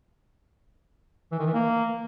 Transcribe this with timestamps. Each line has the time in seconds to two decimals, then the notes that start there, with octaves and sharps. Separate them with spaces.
1.32 E3
1.39 D#3
1.46 E3
1.54 A#3